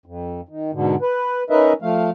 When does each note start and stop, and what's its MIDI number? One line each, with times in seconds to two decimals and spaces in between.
0.06 0.41 41
0.49 0.71 51
0.73 0.95 44
0.73 0.95 47
0.73 0.95 50
1.02 1.43 71
1.50 1.73 61
1.50 1.73 63
1.50 1.73 70
1.50 1.73 71
1.50 1.73 75
1.50 1.73 76
1.82 2.10 53
1.82 2.10 57
1.82 2.10 77